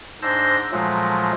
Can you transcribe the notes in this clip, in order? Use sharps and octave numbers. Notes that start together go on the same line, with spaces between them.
G#2 D4 C5 E6 G6 A#6
A#2 F3 F#3 G#3 A3